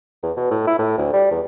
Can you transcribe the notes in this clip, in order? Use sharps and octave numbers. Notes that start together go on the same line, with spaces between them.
E2
B2
A2
E4
A2
D2
G3
E2